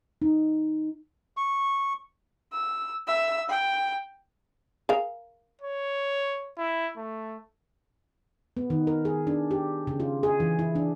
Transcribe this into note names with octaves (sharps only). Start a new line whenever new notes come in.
D#4
C#6
E6
E5 E6
G5
G#4 A#4 F5
C#5
E4
A3
B3
D#3
A#4
G#4
D4
G4
C#3
F4
G#4
E3
E4
D4